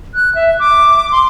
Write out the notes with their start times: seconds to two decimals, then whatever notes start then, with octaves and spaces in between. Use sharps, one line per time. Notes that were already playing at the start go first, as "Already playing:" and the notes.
0.14 F#6
0.35 E5
0.59 D6
1.12 C6